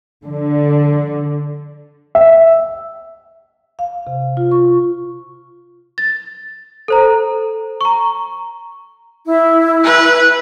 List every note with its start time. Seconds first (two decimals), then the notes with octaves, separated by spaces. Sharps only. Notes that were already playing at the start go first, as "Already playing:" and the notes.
0.25 D3
2.15 E5
3.79 F5
4.07 C3
4.37 F4
4.51 C#6
5.98 A6
6.88 A4 C5 A#5
7.81 A#5 C#6
9.26 E4
9.84 B4